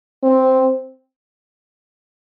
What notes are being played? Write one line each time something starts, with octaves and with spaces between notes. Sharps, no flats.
C4